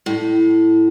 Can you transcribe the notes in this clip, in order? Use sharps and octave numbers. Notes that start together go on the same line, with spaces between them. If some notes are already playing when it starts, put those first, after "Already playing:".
A2